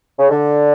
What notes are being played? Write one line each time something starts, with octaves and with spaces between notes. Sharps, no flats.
C#3
D3